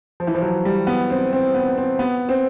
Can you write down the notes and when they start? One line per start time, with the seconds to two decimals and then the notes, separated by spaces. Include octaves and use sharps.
0.20 F3
0.27 E3
0.34 F3
0.42 F#3
0.65 G3
0.87 B3
1.10 C4
1.33 C4
1.55 B3
1.77 C4
1.99 B3
2.29 C4